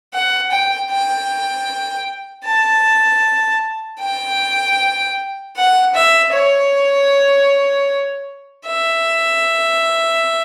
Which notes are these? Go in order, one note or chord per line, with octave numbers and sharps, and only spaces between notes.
F#5
G5
G5
A5
G5
F#5
E5
C#5
E5